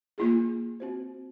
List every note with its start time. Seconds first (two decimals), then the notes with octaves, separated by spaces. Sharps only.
0.18 A#3 F4 G#4
0.80 C4 F#4 C5